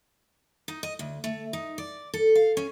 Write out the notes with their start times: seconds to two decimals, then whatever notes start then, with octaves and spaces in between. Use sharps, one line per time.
0.68 D#4
0.83 D#5
0.99 D2
1.24 A3
1.53 D#4
1.78 D5
2.14 A4
2.35 F5
2.57 C#4